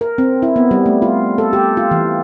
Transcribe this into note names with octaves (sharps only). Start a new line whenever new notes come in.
A#4
C4
E4
B3
G3
A3
F4
A4
G4
F4
E3